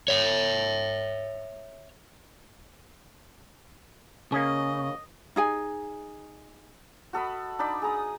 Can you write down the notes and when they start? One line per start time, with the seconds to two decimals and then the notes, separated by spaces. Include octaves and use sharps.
0.08 C#5 E5
4.32 C#3 A#3 C#4 G#4 D#5
5.36 D#4 G#4 G#5
7.13 F#4 A4 D#5 B5
7.59 D4 D#4 D5 B5
7.82 G#4 A#5 D#6